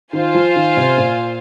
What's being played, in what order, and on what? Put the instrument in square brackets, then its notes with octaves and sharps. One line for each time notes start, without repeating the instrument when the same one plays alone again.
[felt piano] D#3 [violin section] F4 C5 F5 G#5
[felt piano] F3
D#3
C3
A#2